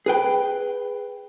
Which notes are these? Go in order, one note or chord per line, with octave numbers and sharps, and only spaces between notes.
G#4 B4 G5